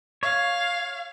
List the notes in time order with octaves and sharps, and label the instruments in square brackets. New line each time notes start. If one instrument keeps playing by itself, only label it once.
[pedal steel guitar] C#5 [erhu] F5